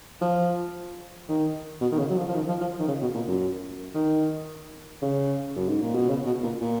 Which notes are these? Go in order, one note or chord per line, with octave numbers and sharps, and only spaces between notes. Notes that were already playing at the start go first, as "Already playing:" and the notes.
F3
D#3
B2
D#3
C#3
F#3
F3
F3
D#3
F3
F3
D#3
C#3
B2
A#2
F#2
D#3
C#3
F#2
G#2
A#2
B2
C#3
B2
A#2
A#2